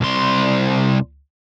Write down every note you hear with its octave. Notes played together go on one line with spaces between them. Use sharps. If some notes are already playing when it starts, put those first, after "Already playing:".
C2 C6